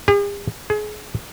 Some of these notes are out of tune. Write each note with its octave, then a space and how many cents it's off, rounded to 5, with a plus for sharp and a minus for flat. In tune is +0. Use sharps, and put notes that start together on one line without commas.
G#4 -45
G#4 +30